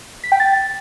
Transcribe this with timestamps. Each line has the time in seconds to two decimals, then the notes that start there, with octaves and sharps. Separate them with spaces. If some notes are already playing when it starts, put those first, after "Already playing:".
0.24 B6
0.32 G5
0.40 A6